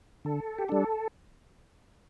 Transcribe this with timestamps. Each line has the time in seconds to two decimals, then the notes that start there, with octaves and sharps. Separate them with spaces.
0.25 D3 A4
0.58 G4
0.69 G3 D4 A4